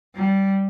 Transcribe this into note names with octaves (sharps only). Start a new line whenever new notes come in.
G3